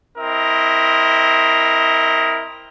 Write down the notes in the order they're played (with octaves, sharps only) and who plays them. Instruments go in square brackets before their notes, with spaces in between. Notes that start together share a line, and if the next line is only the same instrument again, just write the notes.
[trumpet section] C4 E4 A#4 D#5